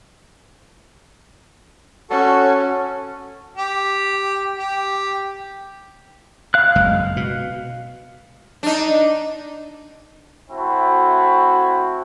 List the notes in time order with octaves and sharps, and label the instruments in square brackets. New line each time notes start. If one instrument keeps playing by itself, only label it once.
[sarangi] C#4 [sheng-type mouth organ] F#4 A4
[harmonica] G4
G4
[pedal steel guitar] F5 F#6
[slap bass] F#1 G#3
B2
[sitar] D4 D#4
[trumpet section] A3 C4 E4 F#4